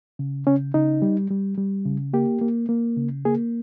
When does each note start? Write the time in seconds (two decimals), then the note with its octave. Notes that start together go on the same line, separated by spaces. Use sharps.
0.19 C#3
0.47 C#3 C#4
0.74 C#3 D#4
1.02 G3
1.30 G3
1.58 G3
1.86 C#3
2.13 A#3 G4
2.41 A#3
2.69 A#3
2.97 C#3
3.25 A#3 G#4